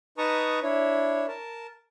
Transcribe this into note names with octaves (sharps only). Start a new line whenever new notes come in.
D#4 B4 A5 A#5 C#6 D#6
D4 E4 C#5
A#4 A5